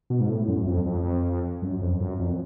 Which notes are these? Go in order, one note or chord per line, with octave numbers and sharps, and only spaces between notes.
B2
G#2
A2
F#2
F2
F2
F#2
F2
F#2
F2